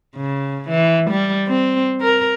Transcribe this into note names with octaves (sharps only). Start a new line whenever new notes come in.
C#3
E3
G3
C4
A#4